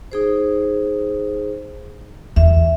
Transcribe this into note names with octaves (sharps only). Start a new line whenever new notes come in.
D#4 G#4 C5
E2 E5